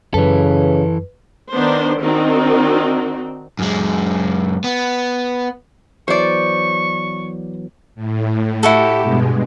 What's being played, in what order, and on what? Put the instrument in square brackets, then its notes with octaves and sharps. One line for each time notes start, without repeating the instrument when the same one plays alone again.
[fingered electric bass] F#2 [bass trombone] C#3 [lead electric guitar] E3 A4 [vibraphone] B4
[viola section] D#3 B3 D4 C5
D#3 C4 D4 D#4 F#4
[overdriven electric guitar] F#2 G#3
B3
[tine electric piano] E3 F#3 B3 [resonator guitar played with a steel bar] C5 D5 [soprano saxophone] C#6
[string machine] A2
[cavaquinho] E4 F#4 A4 [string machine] G4
[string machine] G2 B2 G#3